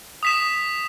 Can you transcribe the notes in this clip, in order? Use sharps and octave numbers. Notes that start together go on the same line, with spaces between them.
D#6 B6 E7